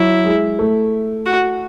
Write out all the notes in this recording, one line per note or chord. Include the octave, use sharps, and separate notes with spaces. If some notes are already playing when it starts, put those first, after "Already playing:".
Already playing: F#3 E4
G#3
A3
F#4